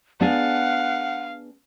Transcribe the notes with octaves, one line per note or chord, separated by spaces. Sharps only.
B3 D4 G#4 F5 F#5